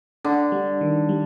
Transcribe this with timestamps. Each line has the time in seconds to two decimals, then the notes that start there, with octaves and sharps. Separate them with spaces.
0.24 D3 D4
0.52 G3
0.81 D#3
1.09 G3